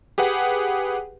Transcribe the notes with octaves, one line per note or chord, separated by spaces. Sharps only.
G4 G#4 B4 F#5